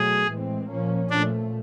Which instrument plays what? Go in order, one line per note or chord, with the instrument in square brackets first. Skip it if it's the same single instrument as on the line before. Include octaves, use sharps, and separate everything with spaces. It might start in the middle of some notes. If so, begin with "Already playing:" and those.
Already playing: [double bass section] B2 F#3 A3 [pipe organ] G#4
[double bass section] A2 E3 G#3 C4
A#2 F3 A#3 C#4
[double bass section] A#2 F3 A3 [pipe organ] D4